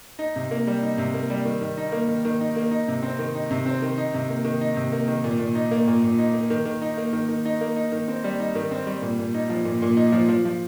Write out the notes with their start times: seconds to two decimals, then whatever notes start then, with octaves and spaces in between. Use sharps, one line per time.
0.19 D#4
0.36 C3
0.51 A#3
0.67 G3
0.83 D#4
0.98 C3
1.14 A#3
1.30 G3
1.45 D#3
1.61 D#3
1.77 D#4
1.92 A#3
2.08 D#3
2.25 D#3
2.41 D#4
2.56 A#3
2.71 D#4
2.88 C3
3.03 C4
3.19 D#3
3.35 D#4
3.51 C3
3.66 C4
3.82 D#3
3.97 D#4
4.14 C3
4.30 A#3
4.45 D#3
4.61 D#4
4.76 C3
4.92 A#3
5.08 D#3
5.24 A#2
5.39 A#2
5.55 D#4
5.71 A#3
5.88 A#2
6.03 A#2
6.19 D#4
6.34 A#3
6.50 D#3
6.66 D#3
6.82 D#4
6.97 A#3
7.13 D#3
7.28 D#3
7.45 D#4
7.61 A#3
7.76 D#4
7.92 D#3
8.08 C4
8.24 G3
8.40 D#4
8.55 D#3
8.71 C4
8.87 G3
9.02 A#2
9.19 A#2
9.34 D#4
9.49 F3
9.65 A#2
9.82 A#2
9.97 D#4
10.12 F3
10.29 F3
10.45 F3